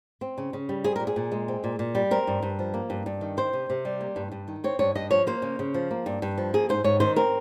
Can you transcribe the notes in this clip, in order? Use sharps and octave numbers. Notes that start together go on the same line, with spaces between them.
C4
C#3
C#3
G3
C4 G#4
A#2 A#4
G#4
A#2
G#3
C4
A#2
A#2
G3
C4 A#4
G2
G2
F3
A#3
G2
G2
D#3
C4 C5
C3
C3
G3
A#3
G2
G2
D#3
C4 C#5
G2 C#5
G2 D#5
F3 C#5
A#3 C5
C#3
C#3
F3
A#3
G2
G2
F3
A#3 G#4
G#2 C5
G#2 C#5
D#3 C5
C4 A#4